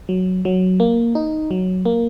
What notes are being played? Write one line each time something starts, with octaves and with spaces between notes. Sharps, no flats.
F#3
F#3
A#3
D#4
F#3
A#3